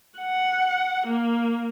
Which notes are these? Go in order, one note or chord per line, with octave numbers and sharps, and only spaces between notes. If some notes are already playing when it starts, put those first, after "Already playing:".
F#5
A#3